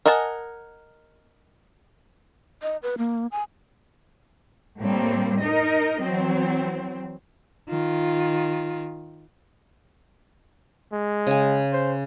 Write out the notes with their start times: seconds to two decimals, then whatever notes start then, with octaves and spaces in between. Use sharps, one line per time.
0.06 A#4 D#5 F#5 G#5 A5
2.62 D#5
2.83 B4
2.98 A#3
3.32 G#5
4.80 A2 G3 A#3 C4
5.41 D#4 A#4 D#5
6.02 E3 F#3 C4
7.70 D#3 F4
10.93 G#3
11.27 C#3 G#5
11.72 C5